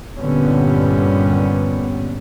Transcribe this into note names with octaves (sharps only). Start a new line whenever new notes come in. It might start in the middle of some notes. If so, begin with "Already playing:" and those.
G2 A#2 D3 G3 B3 C#4